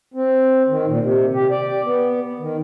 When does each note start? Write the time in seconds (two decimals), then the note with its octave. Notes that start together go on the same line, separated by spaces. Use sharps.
0.14 C4
0.68 D#3
0.87 A#2
1.00 C3
1.33 G4
1.51 D5
1.84 B3
2.39 D#3